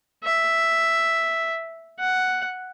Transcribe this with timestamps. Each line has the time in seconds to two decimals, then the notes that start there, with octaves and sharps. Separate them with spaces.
0.24 E5
1.99 F#5